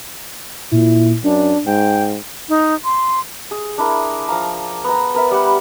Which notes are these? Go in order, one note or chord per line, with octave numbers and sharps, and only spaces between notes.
A#2 E4
F#2 D4
G#2 G5
D#4
C6
G#4
D4 E4 A#4
F3 F5 A#5
B3 A#5
B3 A#4 E5
G3 F#5